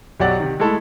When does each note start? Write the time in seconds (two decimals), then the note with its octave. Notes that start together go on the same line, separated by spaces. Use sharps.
0.20 B1 F#3 G4 D5 F#5
0.39 C3 D#3
0.60 G#3 A3 E4 A4